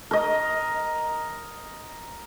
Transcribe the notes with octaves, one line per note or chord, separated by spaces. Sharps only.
A#4 D#5